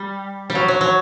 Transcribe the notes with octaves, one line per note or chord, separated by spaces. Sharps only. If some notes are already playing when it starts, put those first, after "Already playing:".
Already playing: G3
G3
F#3
F#3
F#3